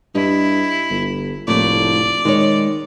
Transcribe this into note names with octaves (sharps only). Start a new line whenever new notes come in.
G2 E4 D#5
G1
F1 A2 A3 A#3 D5
D#3 G#3 C#5